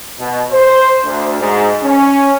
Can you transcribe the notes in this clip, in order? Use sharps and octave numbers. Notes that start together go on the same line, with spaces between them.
B2
C5
D2
G#2
C#4